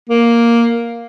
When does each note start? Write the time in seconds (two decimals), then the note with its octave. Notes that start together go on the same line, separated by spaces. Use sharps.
0.09 A#3